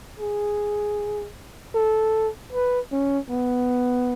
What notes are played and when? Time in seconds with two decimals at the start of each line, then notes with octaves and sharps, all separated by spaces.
0.19 G#4
1.74 A4
2.53 B4
2.92 C#4
3.30 B3